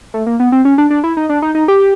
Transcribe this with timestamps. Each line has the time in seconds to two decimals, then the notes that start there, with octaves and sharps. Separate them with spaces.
0.14 A3
0.26 A#3
0.40 B3
0.52 C4
0.65 C#4
0.78 D4
0.90 D4
1.04 E4
1.17 D#4
1.29 D4
1.42 D#4
1.55 D#4
1.68 G4